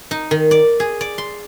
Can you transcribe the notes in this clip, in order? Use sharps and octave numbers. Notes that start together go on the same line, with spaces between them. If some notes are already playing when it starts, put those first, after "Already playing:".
D#4
D#3
D5
G#4
D5
C6